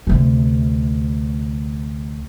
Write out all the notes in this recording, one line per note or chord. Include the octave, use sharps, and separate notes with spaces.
D2 C3